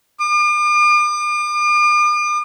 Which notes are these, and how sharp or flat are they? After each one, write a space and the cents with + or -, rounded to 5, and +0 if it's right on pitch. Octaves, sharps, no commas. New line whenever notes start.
D6 +45